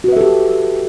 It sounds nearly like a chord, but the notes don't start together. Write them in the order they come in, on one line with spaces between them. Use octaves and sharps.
F#4 B4 E5 A4 G4